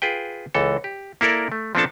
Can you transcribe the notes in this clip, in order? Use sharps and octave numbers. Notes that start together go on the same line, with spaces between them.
F4 G#4 B4 G5
C#2 E3 A4
G4
A#3 E4 A4 A#4 D5
A3
F3 B3 C4 D4 A4 A5